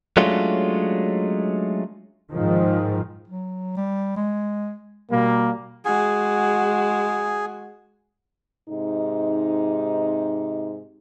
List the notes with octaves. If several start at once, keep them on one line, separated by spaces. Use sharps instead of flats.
F#3 G#3 A3 C#4 D4 F4
G#2 D#3 F3
F#3
G3
G#3
B2 G3 A#3
G#3 F#4 G#4
G#2 C3 D#4